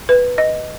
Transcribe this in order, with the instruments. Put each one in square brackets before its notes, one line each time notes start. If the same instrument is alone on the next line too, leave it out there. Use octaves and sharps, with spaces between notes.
[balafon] B4
D#5